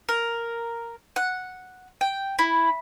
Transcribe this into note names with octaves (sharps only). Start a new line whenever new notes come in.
A#4
F#5
G5
E4